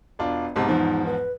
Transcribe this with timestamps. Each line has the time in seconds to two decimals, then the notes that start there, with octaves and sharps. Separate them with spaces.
0.19 E1 D4 F4
0.56 B1 G#2 C3 A5
0.69 E2 G#2 F3 D#4
1.06 B4